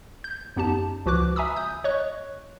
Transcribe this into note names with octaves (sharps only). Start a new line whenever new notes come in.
G6
F#2 B3 D#4 G4 A5
C#2 F3 F#4 B4 D6 F#6
E5 G#5 A#5 B5 D#6 E6
C#2 D#6 G6
C#5 D#5 C#6 F#6